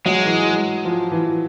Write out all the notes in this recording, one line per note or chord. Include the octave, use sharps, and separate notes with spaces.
F#3 G#3
E3
F3
E3